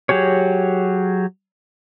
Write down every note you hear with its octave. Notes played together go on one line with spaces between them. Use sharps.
F#3 G4 G#4 C#5